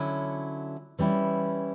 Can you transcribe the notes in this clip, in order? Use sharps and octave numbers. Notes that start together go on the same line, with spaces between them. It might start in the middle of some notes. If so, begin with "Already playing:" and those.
Already playing: D3 F#3 C#4 E4
E3 G3 C#4 E4